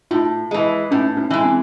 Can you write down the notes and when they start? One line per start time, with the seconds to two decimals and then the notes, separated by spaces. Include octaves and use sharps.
0.11 A2 D#4 F4
0.51 E3 G#3
0.91 A2 C#4 D#4
1.17 C#4 D#4
1.30 E3 G#3
1.44 C4 D4